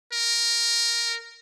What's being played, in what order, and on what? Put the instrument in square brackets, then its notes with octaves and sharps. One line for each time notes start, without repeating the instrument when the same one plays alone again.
[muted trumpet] A#4